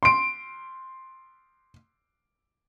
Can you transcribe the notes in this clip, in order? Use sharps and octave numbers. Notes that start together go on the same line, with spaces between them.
C6 D7